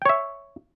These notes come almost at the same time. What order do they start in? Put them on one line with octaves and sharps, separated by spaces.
G5 C#5 E5